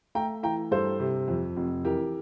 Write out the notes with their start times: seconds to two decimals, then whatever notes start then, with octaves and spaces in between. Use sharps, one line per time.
0.15 A3 G5 A#5
0.43 E3 G5 A#5
0.71 G2 A4 C5
1.00 C3
1.28 F2
1.57 F1
1.84 E3 G4 A#4